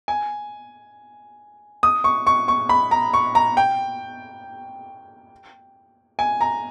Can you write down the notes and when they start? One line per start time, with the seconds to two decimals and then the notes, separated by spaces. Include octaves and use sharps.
0.08 G#5
1.83 D#6
2.04 C#6
2.27 C#6
2.48 C#6
2.69 B5
2.91 A#5
3.14 C#6
3.35 A#5
3.57 G5
6.19 G#5
6.41 A#5